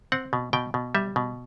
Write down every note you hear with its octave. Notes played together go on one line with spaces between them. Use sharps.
C4 F#5
B2
B2 G5
B2
G3 E5
B2